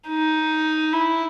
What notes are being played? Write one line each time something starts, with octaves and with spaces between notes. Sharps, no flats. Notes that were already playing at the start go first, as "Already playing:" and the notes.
D#4
E4